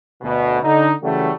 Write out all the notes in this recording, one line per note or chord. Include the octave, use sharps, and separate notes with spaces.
D2 B2
D3 D#4
C#3 E3 F#3 G3 A3